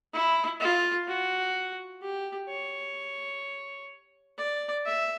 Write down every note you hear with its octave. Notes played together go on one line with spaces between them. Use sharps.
E4
F4
F#4
G4
C#5
D5
E5